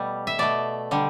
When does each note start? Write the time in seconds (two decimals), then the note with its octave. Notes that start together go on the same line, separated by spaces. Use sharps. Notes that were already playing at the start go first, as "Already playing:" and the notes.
Already playing: B2 G3 A3
0.27 E5
0.39 B2 A3 D5
0.91 D3 G3